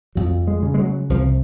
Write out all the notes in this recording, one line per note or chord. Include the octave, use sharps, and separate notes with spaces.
F2 F#3
G#3
C#3
G#3
F#3
C2 F3